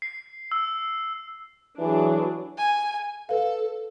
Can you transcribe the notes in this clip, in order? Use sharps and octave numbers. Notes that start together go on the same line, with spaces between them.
C7
E6
E3 F#3 D4 G#4
G#5
A4 B4 F5